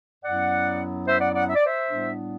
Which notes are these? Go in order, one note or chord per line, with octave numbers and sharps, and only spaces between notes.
F#2 F#3 B3 E4 D5 F#5
C5 E5
D5 F#5
D5 F#5
E5
D5
C5 E5
A2 G3 B3 D4